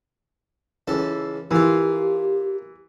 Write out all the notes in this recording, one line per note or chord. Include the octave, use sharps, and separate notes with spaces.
C#2 E3 A4
E3 A#3 F4 G4